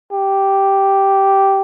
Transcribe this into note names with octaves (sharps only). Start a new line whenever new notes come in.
G4